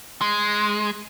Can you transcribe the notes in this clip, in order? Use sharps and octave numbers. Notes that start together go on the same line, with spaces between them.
G#3